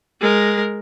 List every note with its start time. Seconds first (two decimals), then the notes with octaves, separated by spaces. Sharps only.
0.21 G#3 A#4